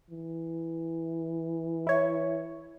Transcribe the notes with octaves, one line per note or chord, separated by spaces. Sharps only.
E3
E4 C#5